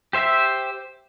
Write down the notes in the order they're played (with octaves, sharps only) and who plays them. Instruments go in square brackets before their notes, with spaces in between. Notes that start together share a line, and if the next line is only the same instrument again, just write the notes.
[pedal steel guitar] G4 C5 E5